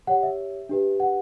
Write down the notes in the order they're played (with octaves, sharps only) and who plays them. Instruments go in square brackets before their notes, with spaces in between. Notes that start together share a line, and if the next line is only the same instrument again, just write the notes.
[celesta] G4 C#5 F#5
E5
D4 G4 B4
F#5